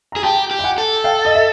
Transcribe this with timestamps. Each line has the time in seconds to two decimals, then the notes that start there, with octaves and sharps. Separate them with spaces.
0.12 G#4 A#5
0.23 G4 G5 A5
0.51 G4
0.59 G5
0.64 F#5 G#5
0.78 A4
1.04 F5 G5
1.25 D#5
1.35 E5